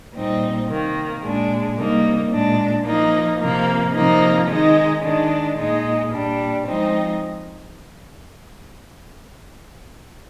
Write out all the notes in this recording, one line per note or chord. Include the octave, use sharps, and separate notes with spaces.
A#2 G3 C4 D#4
C3 D#3 A#3
A#2 G#3 D4
C3 G3 A#3 D#4
A#2 G#3 D4
F3 A#3 D#4
C3 F3 A#3
C3 F3 A#3 D#4
D#3 G#3 D#4
D#3 G#3 D4
A#2 G#3 D#4
A#2 G3 D4
F3 G#3 C4 D#4